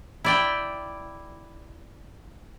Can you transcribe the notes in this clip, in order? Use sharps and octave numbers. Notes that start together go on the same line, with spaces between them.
E4 D5 G5